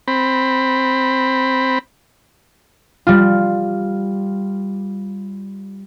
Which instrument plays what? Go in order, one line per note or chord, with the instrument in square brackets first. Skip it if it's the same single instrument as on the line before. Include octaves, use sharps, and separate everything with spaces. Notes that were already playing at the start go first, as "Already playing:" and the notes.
[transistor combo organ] C4 B5
[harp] G3 F4